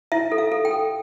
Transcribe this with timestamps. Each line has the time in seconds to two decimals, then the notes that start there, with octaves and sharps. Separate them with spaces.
0.12 E4 E5
0.32 A4
0.38 F5
0.52 A4
0.65 G5
0.71 A4